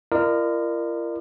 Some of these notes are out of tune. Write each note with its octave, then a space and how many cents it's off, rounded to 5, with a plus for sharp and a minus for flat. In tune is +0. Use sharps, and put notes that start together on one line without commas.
F4 -45 A#4 +0 D5 +40